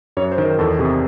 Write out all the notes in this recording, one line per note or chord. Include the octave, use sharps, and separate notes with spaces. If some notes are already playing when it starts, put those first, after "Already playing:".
F#2 C#5
C5
D#3
A#4
E2 A4
C3 G#4